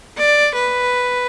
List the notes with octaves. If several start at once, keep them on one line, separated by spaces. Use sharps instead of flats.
D5
B4